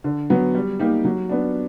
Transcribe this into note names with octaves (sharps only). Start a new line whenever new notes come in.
D3
F#3 B3
G3
A#3 D#4 G4
F#3
B3 D4